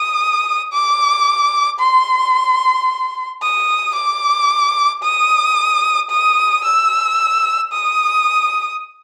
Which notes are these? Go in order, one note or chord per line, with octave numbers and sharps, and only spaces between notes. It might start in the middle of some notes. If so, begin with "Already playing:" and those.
Already playing: D#6
D6
C6
D#6
D6
D#6
D#6
E6
D#6